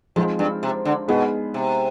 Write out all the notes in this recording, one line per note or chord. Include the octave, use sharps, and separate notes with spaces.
F2 F3 G#3 C4 D#4
G2
C3
D3
B2 G#3 B3 D#4 G#4 B4
C3